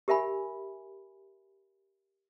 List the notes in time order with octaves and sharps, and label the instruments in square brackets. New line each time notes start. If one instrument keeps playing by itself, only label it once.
[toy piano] G4 A#4 E5 G#5 B5